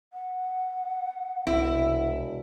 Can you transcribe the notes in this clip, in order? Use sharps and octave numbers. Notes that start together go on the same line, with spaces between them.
F#5
E1 C2 E4